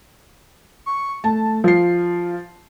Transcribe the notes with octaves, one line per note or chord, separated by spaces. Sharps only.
C#6
A3 A5
F3 F4 C7